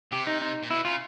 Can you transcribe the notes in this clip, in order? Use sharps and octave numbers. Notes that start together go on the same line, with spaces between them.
C3 G4
D#4
D#4
A#2
B2 E4
C#3 F4